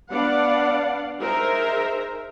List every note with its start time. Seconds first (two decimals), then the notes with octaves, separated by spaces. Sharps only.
0.10 B3 D4 B4 D5 F5 F#5
1.19 D#4 G#4 A#4 C5 E5 A#5